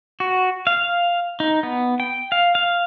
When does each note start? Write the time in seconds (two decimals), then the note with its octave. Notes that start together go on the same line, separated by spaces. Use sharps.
0.20 F#4
0.67 F5
1.40 D#4
1.63 B3
2.00 G5
2.32 F5
2.55 F5